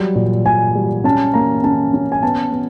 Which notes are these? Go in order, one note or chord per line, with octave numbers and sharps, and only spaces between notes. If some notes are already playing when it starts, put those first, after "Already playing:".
Already playing: F#3 G3
A#2
A#2 G#5
G3
C#4 A5
A#3 A#5
C#4 A5
C#4
G#5
B3 A5
B3